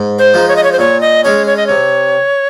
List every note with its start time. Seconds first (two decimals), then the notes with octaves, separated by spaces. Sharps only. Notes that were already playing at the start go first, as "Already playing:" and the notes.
Already playing: G#2
0.19 C5
0.34 F3 G#3 D#4
0.48 C#5
0.56 D#5
0.64 C#5
0.72 C5
0.78 A#2 C#5
1.01 D#5
1.24 G#3 C#4 G#4 C#5
1.46 C#5
1.57 D#5
1.67 C3 C#5